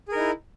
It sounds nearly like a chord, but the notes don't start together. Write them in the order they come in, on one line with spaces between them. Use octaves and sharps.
G#4 A#4 D#4 E4